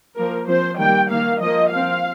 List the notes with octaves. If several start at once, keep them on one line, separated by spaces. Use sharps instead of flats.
F3 A#3 A#4
F3 C4 C5
D#3 G3 A#3 G5
D#3 A#3 F5
F3 A#3 D#5
F3 C4 F5